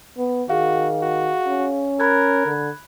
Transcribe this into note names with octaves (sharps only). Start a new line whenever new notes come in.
B3
D#3 F#4 G#4 F5
F#4
C#4
A#4 B5 F#6 G#6
D3